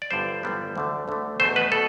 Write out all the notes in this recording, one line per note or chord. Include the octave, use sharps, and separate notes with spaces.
D5
G1 G2 D3 G3 B3 C5
G1 G2 D3 G3 B3
D2 D3 A3
D2 D3 A3
E2 B2 A3 C5
B4
B2 A4